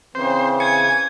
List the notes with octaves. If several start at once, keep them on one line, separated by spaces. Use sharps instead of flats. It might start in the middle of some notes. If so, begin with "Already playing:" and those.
C#3 E3 C4 C5
G#5 G#6 C#7